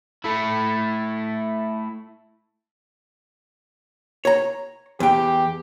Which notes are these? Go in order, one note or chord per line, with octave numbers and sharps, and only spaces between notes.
A3 E4
C#5 A#5
E2 G4 G5